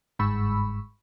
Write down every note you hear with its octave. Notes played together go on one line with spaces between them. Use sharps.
G1 G#2 B5 C#6 E6